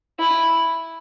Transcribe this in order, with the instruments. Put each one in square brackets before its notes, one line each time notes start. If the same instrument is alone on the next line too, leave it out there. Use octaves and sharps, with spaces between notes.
[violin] E4